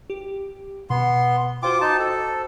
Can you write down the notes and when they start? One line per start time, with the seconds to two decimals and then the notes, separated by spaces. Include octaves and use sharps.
0.10 G4
0.90 B2 B3 C6
1.63 F4 F#4 C5 G5 D6
1.81 D#4 A5
1.99 A4